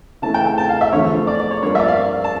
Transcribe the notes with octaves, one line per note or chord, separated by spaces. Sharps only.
C#3 E3 A3 A5
G5
G5
A5
F5
E5
E2 D3 F3 A3 C#5
D5
D5
C#5
G2 F3 A#3 C#5
E5
D5
F5
A5